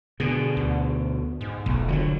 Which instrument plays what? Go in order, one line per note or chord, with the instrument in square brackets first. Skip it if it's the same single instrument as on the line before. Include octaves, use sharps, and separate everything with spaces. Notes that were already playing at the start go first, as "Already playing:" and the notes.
[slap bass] B2 D3 [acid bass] G#4
[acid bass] D2
G#2
[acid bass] F1 [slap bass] B1
[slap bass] D3 F3 F#3